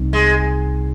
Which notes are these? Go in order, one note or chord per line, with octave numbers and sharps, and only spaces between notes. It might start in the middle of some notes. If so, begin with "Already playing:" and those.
Already playing: C2 C3 G3 C4 D#4
G#3